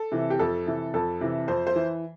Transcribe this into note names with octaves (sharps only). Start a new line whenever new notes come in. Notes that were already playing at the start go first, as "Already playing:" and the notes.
Already playing: A4
C3 E3
G4
F2 A4
C3 E3
F2 A4
C3 E3
F2 C5
C5
E3